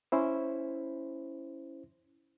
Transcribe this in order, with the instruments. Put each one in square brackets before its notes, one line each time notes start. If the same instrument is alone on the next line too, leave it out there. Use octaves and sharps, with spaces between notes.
[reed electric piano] C#4 E4 C5